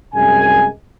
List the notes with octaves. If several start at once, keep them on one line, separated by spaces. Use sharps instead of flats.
C2 F#2 G#3 G#4 G#5